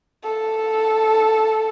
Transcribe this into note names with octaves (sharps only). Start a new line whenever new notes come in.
A4